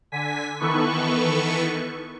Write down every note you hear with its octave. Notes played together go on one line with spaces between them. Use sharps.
D3 G#5 B6
D#3 E3 B3 A4 B4 C#6